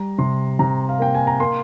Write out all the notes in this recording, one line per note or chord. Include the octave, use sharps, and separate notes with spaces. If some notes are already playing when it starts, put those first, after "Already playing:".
Already playing: G3 A#5
C3 C6
C3 A#5
F5
A#3 G5
G#5
A#5
A#3 C6